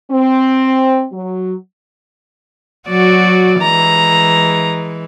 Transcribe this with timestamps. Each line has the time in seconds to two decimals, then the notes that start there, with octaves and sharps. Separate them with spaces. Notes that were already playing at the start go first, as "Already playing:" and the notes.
0.11 C4
1.13 F#3
2.88 F#3 F#4 D5
3.62 E3 G#3 A#5